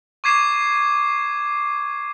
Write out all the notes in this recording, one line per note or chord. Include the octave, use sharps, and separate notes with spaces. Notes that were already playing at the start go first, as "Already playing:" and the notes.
C#6 D6 G#6 C7 E7